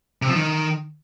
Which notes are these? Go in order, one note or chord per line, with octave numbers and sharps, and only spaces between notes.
C3
F3
D#3